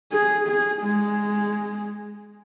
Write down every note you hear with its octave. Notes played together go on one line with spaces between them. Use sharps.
G#4
G#4
G#3